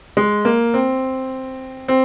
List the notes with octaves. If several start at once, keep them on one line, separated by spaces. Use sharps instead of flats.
G#3
A#3
C4
C4